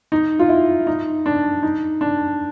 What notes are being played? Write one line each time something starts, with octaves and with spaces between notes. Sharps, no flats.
D#4
F4
E4
D#4
D4
D#4
D4